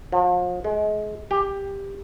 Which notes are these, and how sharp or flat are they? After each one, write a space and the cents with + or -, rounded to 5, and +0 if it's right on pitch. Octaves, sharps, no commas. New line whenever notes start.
F3 +40
G#3 +30
G4 +10